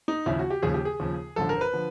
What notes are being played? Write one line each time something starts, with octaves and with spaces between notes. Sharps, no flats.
D#4
D#2 C#3 F3 E4
F#4
G4
D#2 C#3 F3 G#4
G4
G#4
D#2 C#3 F3
A1 G2 D3 F3 A4
A#4
C5
B4
D3 F3